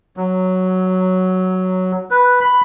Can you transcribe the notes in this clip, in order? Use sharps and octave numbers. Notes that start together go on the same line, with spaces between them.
F#3
B4
B5